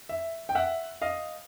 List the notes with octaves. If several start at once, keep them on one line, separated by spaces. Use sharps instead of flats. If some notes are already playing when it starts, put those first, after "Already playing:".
E5
G5
E5 F#5
D#5 F5